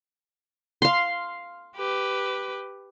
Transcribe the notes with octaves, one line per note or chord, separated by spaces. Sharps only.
F5 C6
G4 B4